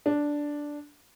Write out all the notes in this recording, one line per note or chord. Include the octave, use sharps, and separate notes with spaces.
D4